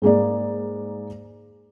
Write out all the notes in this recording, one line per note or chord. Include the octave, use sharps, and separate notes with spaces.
G#2 G#3 A#3 D5